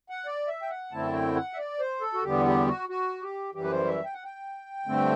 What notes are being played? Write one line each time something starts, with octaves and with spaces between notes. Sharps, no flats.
F#5
D5
E5
G5
F#5
F#2 D3 A3 C4 E4 A5
G5
F#5
E5
D5
C5
A4
F#4
E2 D3 G3 B3 G4
G4
F#4
F#4
G4
F#2 E3 G3 G4
B4
C5
E5
G5
F#5
G5
G2 D3 A3 C4